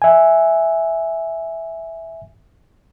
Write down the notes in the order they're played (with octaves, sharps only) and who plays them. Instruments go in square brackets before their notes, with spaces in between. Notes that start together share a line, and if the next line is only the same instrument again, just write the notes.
[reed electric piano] E5 G#5